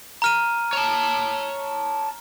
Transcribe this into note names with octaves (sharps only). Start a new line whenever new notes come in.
A#5 F6 D#7
C#5 A5